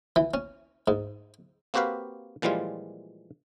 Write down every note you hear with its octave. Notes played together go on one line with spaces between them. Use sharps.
E3
C#4
G#2
A#3 C4 F#4 G4 B4 F5
A#2 E3 F3 G3 G#3 F4